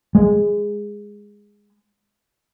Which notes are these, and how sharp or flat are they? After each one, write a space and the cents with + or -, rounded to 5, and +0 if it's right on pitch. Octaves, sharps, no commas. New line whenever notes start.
G#3 -10